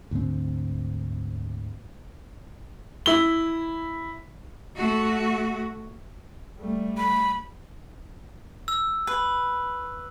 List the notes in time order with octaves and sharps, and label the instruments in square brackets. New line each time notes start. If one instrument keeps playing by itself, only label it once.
[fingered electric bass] D2 G#2 D3 C4
[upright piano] E4 G7
[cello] A3 F#4
[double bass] G3 A3
[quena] B5
[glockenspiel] E6
[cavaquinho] B4